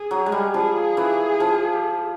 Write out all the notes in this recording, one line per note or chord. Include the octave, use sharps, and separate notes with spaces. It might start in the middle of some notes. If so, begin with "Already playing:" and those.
Already playing: G#4
F#3
G#3
G3
F3 G#4
E3
F3